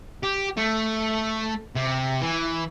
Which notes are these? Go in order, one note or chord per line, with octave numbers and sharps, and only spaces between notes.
G4
A3
C3
E3